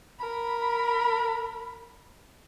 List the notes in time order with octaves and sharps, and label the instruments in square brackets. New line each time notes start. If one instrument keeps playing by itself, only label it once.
[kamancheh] A#4 B5